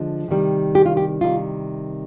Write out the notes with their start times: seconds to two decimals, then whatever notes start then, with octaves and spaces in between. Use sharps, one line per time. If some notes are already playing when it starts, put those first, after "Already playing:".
Already playing: D3 F3 G#3
0.28 C3 D#3 G3
0.75 G4
0.86 F4
0.97 G4
1.21 C3 D#3 G3 F4